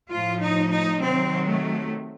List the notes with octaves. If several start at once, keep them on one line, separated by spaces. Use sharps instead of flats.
A2 F3 F4
D#4
D#4
C3 D#3 F#3 C4
A3